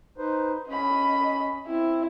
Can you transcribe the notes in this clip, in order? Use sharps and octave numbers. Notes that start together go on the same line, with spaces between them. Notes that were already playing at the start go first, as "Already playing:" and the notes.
D#4 B4 C5
C#4 D#5 B5
C4 E4